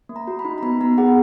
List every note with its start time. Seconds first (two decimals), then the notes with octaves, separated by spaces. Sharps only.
0.09 A#3
0.16 A#5
0.27 F#4
0.39 B5
0.45 D#4
0.58 A#5
0.62 B3 B5
0.81 B3 A#5
0.98 G#4 F#5